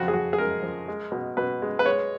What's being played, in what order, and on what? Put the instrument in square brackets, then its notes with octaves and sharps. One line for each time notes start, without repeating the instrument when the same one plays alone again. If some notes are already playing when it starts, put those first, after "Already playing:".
Already playing: [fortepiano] F2 C#3 F#4
G#4
F2 F#4
G#4
G#3 A#4
F3
G#3
B2
B2 B4
G#3
B4
G#3 C#5